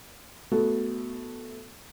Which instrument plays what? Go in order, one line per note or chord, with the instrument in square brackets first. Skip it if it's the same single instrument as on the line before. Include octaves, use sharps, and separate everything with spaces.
[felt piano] A3 B3 F#4 A4